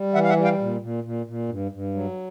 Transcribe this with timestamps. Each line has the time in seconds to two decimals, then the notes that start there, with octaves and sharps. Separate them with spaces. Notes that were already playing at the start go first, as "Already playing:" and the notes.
Already playing: G3
0.14 E3 E5 F#5
0.24 F5
0.29 E5 F#5
0.36 G3
0.44 F5 G5
0.59 A#2
0.81 A#2
1.04 A#2
1.26 A#2
1.49 G2
1.72 G2
1.94 F#3